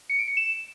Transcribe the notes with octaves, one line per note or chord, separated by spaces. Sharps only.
C#7
D7
C#7
E7